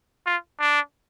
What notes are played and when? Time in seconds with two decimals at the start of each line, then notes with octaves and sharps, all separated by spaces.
0.26 F4
0.60 D4